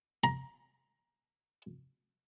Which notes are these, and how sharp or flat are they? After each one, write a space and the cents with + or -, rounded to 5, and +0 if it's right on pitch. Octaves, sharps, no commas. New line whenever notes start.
A#5 +20